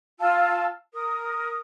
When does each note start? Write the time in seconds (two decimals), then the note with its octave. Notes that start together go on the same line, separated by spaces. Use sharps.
0.19 F4 A5 E6
0.94 A#4 D#6